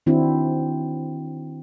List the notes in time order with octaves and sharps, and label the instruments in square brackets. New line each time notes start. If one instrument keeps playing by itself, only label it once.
[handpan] D#3 C4 D4 E4 F#4